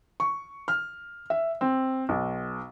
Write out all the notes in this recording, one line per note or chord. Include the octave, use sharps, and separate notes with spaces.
C#6
F6
E5
C4
B1